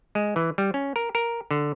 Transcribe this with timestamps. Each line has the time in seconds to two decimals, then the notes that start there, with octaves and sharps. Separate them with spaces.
0.15 G#3
0.36 E3
0.58 G3
0.74 C#4
0.96 A#4
1.15 A#4
1.51 D3